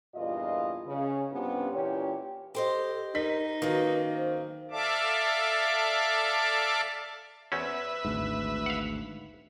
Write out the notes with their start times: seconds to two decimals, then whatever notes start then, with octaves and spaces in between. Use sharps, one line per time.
0.15 E2 G2 A#2 F4 D#5
0.86 C#3
1.31 G2 C3 B3 C#4 D4 F4
1.71 A#2 E3 C#4 G4 C#5
2.55 G4 A4 C5 D#5
3.15 D#4 A#4 B6
3.62 F#2 D#3 A#3 B4
4.16 C5
4.71 A4 D5 E5 F5 A5 D6
7.52 E2 C4 C#4 B4 E5
8.05 G#1 D2 G#2
8.66 F5 F#5